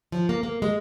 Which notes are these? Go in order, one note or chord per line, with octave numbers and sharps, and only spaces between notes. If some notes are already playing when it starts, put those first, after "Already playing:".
F3
A#3
A#3
G#3